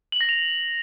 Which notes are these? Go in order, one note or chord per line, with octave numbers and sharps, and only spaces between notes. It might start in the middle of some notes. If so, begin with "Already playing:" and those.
F#7
A#6
F7